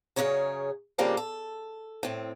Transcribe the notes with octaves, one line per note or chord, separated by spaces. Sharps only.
F#2 C#3 G#4 C#5 A#5
C#3 F3 G3 A#3 C4 D4
A4
A2 C4